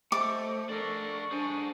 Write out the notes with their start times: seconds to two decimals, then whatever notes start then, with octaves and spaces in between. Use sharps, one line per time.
0.12 A3 C5 D#5 D6
0.69 D4 A4 A#4 C#6
1.31 D4 G#4 C5 G#5